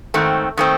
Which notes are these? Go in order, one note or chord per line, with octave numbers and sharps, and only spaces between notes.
G#2 D#3 A3 C4
D#3 A3 C4